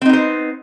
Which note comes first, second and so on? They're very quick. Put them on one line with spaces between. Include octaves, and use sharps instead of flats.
C4 D#4 B3 C5